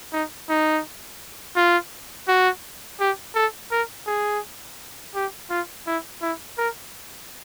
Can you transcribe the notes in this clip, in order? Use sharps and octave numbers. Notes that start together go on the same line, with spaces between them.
D#4
D#4
F4
F#4
G4
A4
A#4
G#4
G4
F4
E4
E4
A#4